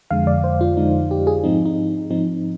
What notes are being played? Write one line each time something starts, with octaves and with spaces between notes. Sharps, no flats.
F2 D3 G#3 F5
D5
C5
F4
F2 D3 G#3 D#4
G4
G#4
G#2 F3 C4 D#4
D#4
G#2 F3 C4 D#4